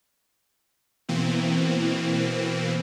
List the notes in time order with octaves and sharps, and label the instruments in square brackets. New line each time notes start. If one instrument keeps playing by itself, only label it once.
[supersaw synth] B2 E3 A#3 C4